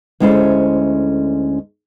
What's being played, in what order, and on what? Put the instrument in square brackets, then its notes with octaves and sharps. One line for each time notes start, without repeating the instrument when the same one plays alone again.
[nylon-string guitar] D2 G#3 C#4 E4 A4 C5